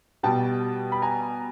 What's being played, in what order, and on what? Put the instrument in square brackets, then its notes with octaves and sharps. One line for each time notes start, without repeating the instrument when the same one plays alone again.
[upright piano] B2 G3 G5 A5
B5
G#5 A#5